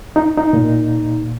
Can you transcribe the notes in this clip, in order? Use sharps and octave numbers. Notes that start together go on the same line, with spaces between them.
D#4
D#4
A#2